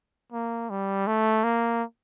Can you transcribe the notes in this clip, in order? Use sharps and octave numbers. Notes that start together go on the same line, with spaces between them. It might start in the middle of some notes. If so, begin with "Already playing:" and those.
A#3
G3
A3
A#3